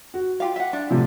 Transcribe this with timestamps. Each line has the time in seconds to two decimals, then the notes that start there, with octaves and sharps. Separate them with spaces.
0.14 F#4
0.40 F4 G4 F5
0.56 E5 F#5
0.73 D4
0.90 A2 C3 F3